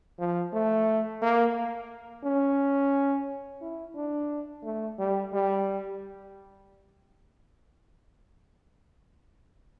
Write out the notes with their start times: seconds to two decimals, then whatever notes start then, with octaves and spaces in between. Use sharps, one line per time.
0.19 F3
0.53 A3
1.22 A#3
2.24 C#4
3.61 E4
3.95 D4
4.63 A3
4.99 G3
5.33 G3